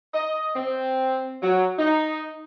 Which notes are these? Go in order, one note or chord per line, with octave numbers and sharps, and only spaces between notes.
D#5
C4
F#3
D#4